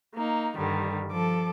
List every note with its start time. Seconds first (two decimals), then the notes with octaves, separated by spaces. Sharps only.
0.16 A#3 D#4
0.56 G2 D3 D#3 G3
1.11 F3 A4 D6